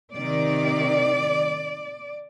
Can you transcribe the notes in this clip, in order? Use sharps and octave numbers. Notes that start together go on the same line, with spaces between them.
C3 D#3 D5